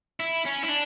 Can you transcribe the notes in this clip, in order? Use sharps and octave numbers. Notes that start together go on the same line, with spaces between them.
E4
C#4
E4
D4